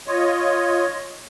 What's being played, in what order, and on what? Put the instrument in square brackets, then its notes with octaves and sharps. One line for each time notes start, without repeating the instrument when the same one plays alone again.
[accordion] F4 C#5 D#5